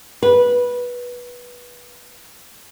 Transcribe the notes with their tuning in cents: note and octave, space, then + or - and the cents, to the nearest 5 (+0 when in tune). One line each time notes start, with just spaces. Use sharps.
B4 -15